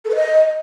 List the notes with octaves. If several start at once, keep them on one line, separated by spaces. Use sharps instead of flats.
A4
B4
D#5